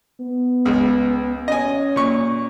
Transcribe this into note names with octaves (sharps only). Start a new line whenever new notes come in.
B3
C#2 G#3
C#4 D#5 G#5
A#2 C#6